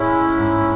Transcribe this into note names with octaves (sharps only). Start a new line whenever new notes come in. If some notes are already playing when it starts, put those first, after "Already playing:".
Already playing: A2 G#3 C#4 E4
G#2